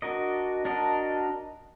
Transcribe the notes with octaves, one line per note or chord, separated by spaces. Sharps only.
D4 F#4 A#4 D#5
D4 F#4 A#4 D#5